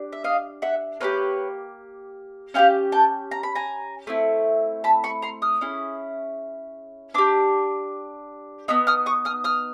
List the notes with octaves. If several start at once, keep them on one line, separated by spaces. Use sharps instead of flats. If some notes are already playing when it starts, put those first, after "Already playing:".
Already playing: D4 G4
E5
D#5 F5
E5 F#5
A#3 D4 G4 B4 C#5
C#4 E4 G4 F5 G5
G5 A5
A#5
B5
G#5 A#5
A3 C4 E4
A5 B5
B5 C#6
A#5 C6
D#6 F6
C#4 E4 G#4
D4 G4 D6 E6
B3 D#4 E6
D#6 F6
C#6 D#6
D#6 F6
D#6 F6